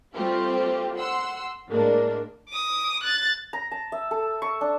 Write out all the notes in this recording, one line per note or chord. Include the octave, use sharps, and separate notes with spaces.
G3 A3 C4 F4 G4
F#5 C6 E6
A2 G#3 A#3 D4
D6 D#6
F#6 A6
A#5
A5
E5
A4
C#6
D4